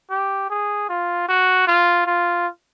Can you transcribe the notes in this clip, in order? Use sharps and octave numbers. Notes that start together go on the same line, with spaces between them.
G4
G#4
F4
F#4
F4
F4